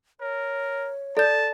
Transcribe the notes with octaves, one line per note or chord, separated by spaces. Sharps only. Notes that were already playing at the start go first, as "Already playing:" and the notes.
A#4 C#5
A4 D5 A5 G6